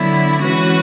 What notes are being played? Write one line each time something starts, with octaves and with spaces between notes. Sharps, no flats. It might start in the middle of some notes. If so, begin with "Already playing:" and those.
Already playing: D3 F#3 B3 E4
E3 G#3 C#4 F#4 B4